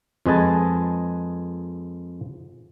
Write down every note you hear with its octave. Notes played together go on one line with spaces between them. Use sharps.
F2 G#3 B4 D#5 G#5 A5